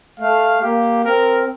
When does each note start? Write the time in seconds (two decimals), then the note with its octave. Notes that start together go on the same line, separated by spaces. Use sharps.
0.20 A3 F5
0.63 A#3 G4
1.05 C4 A#4